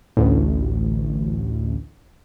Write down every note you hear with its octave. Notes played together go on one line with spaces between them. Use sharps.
A1 D2